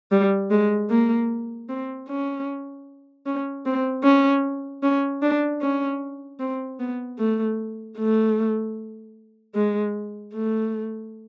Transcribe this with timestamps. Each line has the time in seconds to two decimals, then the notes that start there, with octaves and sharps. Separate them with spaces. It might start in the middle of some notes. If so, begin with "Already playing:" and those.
0.12 G3
0.51 G#3
0.90 A#3
1.69 C4
2.08 C#4
3.26 C#4
3.66 C4
4.04 C#4
4.83 C#4
5.22 D4
5.61 C#4
6.40 C4
6.80 B3
7.19 A3
7.97 A3
9.55 G#3
10.34 A3